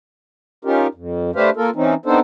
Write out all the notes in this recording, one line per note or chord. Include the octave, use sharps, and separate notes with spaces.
C#4 D#4 F4 G4 A#4
F2
A3 D4 G4 B4 C5 F5
A#3 F4 A4 A#4
E3 C4 C#4 D#4
B3 C4 D4 D#4 A4 C5